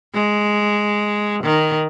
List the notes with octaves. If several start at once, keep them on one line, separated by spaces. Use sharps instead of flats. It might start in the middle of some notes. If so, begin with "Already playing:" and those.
G#3
D#3